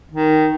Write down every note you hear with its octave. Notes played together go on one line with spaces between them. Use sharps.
D#3